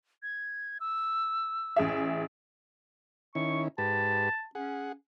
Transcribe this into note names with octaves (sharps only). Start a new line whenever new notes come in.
G#6
E6
A1 G#4 E5
D#3 C#4 E4 C#6
G#2 G4 B4 A5
C#4 G#4 F#5